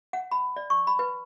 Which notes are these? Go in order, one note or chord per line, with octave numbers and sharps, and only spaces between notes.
F#5
B5
D5
C#6
B5
B4